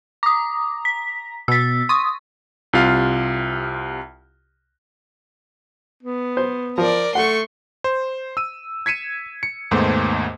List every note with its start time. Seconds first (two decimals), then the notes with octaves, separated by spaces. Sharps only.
0.23 A#5 D6 D#6
0.85 B6
1.48 B2 E6 A6 B6
1.89 C6 C#6 D#6
2.73 C2 C3 F4 F5
6.03 B3
6.37 C5
6.78 F3 A#4 D5
7.15 A3 F#5 C6 C#6
7.84 C5
8.37 E6 D#7
8.86 G#6 B6 C#7 D#7 E7
9.43 C#7
9.71 D#2 G#2 A3 B3 C5